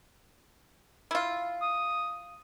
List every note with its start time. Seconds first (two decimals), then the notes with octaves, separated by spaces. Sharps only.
1.11 E4 F4
1.62 D#6